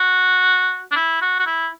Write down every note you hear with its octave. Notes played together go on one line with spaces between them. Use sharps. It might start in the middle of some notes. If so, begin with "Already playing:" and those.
Already playing: F#4
D4
E4
F#4
F#4
E4